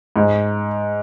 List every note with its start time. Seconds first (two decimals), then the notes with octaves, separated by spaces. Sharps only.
0.16 G#2